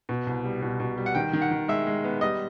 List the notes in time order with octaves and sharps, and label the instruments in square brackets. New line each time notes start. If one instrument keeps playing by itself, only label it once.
[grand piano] B2
C2
G3
B2
B2
G3
[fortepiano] F#5
[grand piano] D#3 [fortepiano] G5
[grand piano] D#3
[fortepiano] F#5
[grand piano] D#3
[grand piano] G#3 [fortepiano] E5
[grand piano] G#3
B3
[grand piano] G3 [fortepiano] D#5